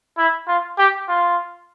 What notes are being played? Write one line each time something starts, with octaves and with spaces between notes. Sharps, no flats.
E4
F4
G4
F4